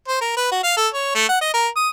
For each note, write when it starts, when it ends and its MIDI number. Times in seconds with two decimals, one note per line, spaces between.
0.08 0.20 72
0.21 0.35 70
0.37 0.50 71
0.51 0.62 66
0.63 0.76 77
0.77 0.88 69
0.94 1.14 73
1.15 1.28 57
1.29 1.38 78
1.41 1.52 75
1.54 1.68 70
1.76 1.89 87